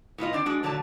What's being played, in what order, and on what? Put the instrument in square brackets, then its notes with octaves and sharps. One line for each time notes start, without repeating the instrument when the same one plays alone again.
[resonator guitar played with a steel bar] A2 B3 F4 D#5
C4 D4 D5
G#3 D4 F#4
A#2 D3 F#3 A3 D5 A5